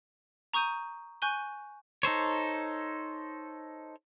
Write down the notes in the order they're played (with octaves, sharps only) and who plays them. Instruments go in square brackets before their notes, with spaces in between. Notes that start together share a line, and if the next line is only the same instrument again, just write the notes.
[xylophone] A#5 C#6 D#6 G6 D#7
G#5 C#6 F#6 G6 D#7 G7
[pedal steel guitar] D#4 A4 C5 C#5